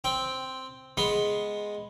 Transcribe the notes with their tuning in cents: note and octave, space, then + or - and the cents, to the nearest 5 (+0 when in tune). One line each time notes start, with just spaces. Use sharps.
C4 +0 G5 +0
G#3 +0 B3 +0 C6 +5